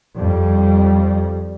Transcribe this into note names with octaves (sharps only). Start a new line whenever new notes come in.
F2 G3